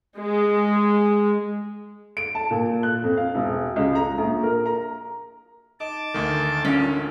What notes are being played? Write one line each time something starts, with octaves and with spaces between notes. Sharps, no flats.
G#3
D7
A5
A#2
F#6
F2
F5
E1
C#2
A#5
A#1
A#4
A#5
D#4 A5 D6
D2 D#3
A1 C#4 D4 F4